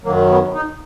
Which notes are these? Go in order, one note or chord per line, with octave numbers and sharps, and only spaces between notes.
F#2 D#3 F#3 A#3
B3
D#4